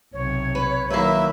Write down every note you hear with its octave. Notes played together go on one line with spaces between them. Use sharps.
B1 C3 C#5
B4
D#3 F#3 A#3 E4 B4 E5